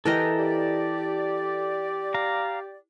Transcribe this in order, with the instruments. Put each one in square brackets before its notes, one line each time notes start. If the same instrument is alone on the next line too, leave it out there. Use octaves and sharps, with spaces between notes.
[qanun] E3 A#4 D#5 [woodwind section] E4 G4 G5 [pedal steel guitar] A4 A#5
[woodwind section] G4 D5
[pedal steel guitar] F5 A#5